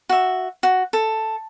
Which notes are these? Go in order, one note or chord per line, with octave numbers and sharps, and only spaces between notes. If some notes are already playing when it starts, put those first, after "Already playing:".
F#4 E5
F#4
A4